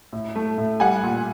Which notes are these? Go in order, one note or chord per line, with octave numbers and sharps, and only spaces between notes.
A2
A3
A2
G3 F#5 G#5
A#2